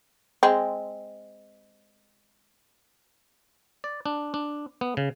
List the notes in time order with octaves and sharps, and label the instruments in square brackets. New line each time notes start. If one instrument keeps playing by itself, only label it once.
[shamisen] G#3 C4
[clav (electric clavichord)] D5
D4
D4
B3
C#3